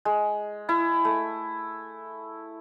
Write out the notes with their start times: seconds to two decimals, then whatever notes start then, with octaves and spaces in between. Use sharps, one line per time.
0.05 G#3
0.69 E4
1.05 A3